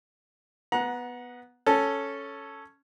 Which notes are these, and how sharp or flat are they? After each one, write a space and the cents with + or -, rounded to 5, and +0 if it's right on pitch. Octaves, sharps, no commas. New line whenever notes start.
B3 +0 F#5 -15 A#5 +25
C#4 +0 A4 +0